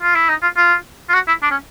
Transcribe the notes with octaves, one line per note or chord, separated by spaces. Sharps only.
F4
E4
D#4
F4
F4
F4
F#4
E4
D4
C#4